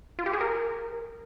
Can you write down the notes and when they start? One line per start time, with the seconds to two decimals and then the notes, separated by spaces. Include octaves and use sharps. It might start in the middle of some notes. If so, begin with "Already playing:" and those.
0.19 F4
0.26 G4
0.33 G#4
0.41 A#4